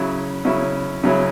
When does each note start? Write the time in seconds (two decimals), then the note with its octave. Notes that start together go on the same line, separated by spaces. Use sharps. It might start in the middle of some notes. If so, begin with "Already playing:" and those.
Already playing: C#3 F#3 C#4 E4
0.45 C#3 F#3 C#4 E4
1.04 C#3 F#3 C#4 E4